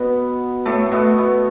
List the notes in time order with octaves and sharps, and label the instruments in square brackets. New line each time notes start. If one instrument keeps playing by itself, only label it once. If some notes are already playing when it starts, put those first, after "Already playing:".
Already playing: [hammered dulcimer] B2 B3
A2 A3
A3
B2 B3
B2 B3